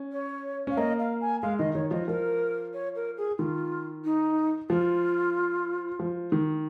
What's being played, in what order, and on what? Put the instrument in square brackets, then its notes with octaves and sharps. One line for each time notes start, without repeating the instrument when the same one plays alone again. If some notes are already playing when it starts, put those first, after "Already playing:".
Already playing: [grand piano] C#4
[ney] C#5
[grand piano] C#4 [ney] F5
[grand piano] A#3 [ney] D#5
[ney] F5
G#5
[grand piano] G#3 [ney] F5
[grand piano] D#3 [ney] D#5
[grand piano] D#3 [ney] C#5
[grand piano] F3 [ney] D#5
[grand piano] F3 [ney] A#4
[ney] C#5
A#4
G#4
[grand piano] D#3 [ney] F4
[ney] D#4
[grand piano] F3 [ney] F4
[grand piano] F3
D#3